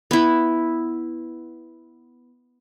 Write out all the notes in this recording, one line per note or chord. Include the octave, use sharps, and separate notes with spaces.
B3 E4